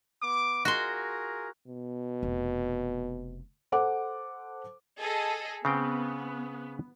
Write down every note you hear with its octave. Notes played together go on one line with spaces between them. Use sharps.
B3 D6
F4 F#4 G#4 A#4 C6
B2
F1
A4 C5 F#5 D6
G#4 A4 D#5
C#3 B3 C4 G5